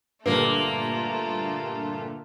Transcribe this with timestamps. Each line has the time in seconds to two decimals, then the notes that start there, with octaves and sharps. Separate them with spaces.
0.26 G2 A#2 D3 A3 A#3 F4 B4